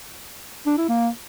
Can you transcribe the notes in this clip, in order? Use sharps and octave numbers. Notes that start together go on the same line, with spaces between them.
D4
E4
A#3